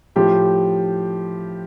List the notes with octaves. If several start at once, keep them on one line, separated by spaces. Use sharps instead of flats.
A2 F3 G4